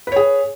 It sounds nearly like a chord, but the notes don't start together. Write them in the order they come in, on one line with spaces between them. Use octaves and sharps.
B4 C#5 G#4